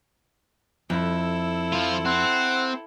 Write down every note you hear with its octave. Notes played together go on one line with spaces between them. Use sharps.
F2 E4 A4
F3 F4
C4 F#5